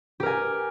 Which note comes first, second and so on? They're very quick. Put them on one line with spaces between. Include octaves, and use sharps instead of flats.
G4 A#4 G#5